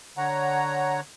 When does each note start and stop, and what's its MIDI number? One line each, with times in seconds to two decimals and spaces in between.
0.17 1.01 50
0.17 1.01 73
0.17 1.01 78
0.17 1.01 82